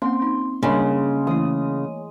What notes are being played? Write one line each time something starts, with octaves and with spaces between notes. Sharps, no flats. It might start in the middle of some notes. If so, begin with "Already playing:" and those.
A#3 C4 C#4 F#5 C6
D#4
C#3 G3 G#3 A#3 D4 C#5
E3 A3 E4 D#6